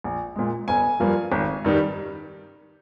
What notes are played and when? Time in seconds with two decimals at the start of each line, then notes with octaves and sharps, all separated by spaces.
0.04 A#1
0.36 A#2 G#3
0.68 G1 G#5
1.00 G2 F3 A#3
1.32 G#1
1.65 G2 D#3 G3